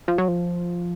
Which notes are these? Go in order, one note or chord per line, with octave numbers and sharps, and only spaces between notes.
F3
F#3
F3